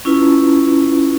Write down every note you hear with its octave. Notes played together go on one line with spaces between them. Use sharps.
C#4 E4 F4 B4